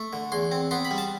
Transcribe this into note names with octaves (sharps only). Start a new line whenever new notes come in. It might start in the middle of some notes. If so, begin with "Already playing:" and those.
Already playing: A3
D3
E2 C6
C4
B3 C6
B5
G3
A5